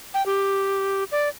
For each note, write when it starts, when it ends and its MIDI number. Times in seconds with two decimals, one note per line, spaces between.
0.14 0.25 79
0.26 1.04 67
1.12 1.29 74